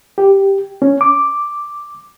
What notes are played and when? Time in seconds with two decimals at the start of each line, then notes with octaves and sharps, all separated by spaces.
0.18 G4
0.82 C#4
1.01 D6